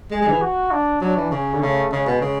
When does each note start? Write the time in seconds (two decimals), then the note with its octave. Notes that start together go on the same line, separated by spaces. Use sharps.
0.11 G#3 G#4
0.22 G#3
0.27 D3
0.32 E3
0.42 F#4
0.71 D4
1.01 F#3 D4
1.17 E3
1.31 C#3 C#4
1.54 D3
1.61 C#3 A3
1.92 C#3 G#3
2.06 B2
2.21 C#3